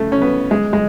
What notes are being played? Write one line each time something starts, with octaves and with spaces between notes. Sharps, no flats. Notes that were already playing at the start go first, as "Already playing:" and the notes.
Already playing: C#3 A3
C#4
B3
G#3
G#3